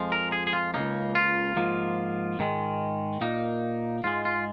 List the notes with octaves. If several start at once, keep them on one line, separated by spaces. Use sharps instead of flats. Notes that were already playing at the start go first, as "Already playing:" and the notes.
Already playing: F2 F3 G#3
A#4
G#4
G#4
F4
C#2 C#3 A#3 D#4
F4
G#2 F3 A#3
G#2 D#3 G#3
A#2 A#3 D#4
G#2 G#3 F4
F4